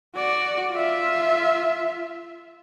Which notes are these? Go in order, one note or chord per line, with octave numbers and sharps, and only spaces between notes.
F#4 D5
F4 E5